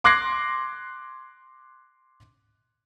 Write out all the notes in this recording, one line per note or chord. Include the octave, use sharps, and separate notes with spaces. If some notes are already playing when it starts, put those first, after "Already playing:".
C6 D6 F#6 G#6 A#6 C7